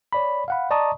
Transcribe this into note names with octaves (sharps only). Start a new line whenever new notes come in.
C#5 D5 B5
F5 F#5 B5
D5 D#5 A5 A#5 C#6 D#6